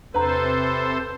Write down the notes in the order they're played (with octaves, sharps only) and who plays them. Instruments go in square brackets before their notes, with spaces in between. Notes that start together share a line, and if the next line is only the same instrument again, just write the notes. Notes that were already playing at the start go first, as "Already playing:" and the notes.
[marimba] E2 A#5 [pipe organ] C3 A4 C5 [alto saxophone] B4